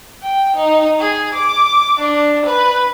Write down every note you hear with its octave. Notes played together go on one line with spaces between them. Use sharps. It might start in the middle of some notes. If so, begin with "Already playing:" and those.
G5
D#4
G#4
D6
D4
B4